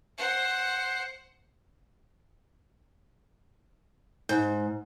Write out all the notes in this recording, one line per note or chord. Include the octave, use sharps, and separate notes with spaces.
C5 F#5
G#2